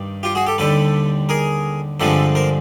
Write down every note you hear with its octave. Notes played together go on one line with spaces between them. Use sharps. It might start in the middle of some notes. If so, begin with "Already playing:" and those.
Already playing: G2 D#3 G3
F4 G4
F#4 G#4
G4 A4
D#2 D3 G3 A4 B4
G#4 A#4
G2 D3 F3 G#3 C4 A4 B4
A#4 C5